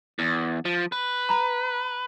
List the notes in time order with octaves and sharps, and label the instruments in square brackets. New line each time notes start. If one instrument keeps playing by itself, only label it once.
[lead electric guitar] E2
F3
B4
[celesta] A#5 B5